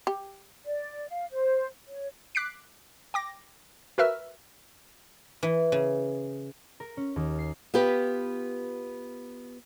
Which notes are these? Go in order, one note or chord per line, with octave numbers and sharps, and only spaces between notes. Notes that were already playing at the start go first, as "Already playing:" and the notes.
G4
D5
F5
C5
C#5
D6 F#6 B6 C7 D7
G5 D6 A#6
F#4 A#4 B4 E5 E6 F6
E3
C#3
A#4
C#4
D#2
C7
B3 F4 G4 B4